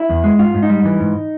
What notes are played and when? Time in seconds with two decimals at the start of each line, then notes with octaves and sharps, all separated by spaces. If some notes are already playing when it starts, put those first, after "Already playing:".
Already playing: E4
0.09 E2
0.24 G#3
0.39 G#2 F4
0.54 G#2
0.63 D#4
0.69 G3
0.85 E3
1.00 G#2